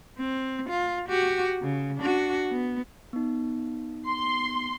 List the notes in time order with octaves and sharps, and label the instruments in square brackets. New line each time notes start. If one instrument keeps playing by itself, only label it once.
[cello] C4
F4
F#4 G4
C#3
D4 F#4
B3
[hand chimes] B3 D#4
[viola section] C6